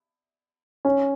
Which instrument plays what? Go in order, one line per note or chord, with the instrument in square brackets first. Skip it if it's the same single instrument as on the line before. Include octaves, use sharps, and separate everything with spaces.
[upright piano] C#4